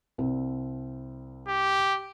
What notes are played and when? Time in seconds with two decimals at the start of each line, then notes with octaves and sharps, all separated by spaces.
0.18 C2 C4
1.48 G4